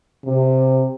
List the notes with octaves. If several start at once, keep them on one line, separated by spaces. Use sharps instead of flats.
C3